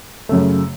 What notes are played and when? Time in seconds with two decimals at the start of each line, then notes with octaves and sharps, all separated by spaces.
0.29 F#2 C#3 A3